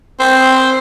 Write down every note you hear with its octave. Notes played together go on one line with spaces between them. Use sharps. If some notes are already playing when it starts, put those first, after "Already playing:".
C4